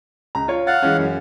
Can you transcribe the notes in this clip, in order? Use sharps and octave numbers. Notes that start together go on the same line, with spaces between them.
C#2 A#5
F4 C#5
F5 F#5 A6
E3 G#3 C#4
F#2